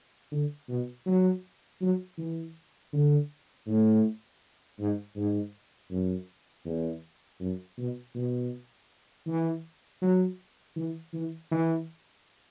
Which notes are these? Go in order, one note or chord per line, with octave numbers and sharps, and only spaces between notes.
D3
B2
F#3
F#3
E3
D3
A2
G#2
G#2
F#2
E2
F#2
B2
B2
E3
F#3
E3
E3
E3